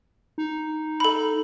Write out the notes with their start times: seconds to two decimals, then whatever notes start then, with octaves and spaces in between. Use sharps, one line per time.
0.38 D#4
1.00 A4 B5